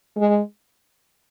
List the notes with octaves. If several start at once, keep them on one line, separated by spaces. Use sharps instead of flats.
G#3